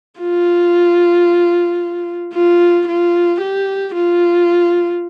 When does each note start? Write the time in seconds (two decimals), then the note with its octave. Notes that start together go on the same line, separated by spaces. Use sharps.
0.20 F4
2.34 F4
2.88 F4
3.41 G4
3.95 F4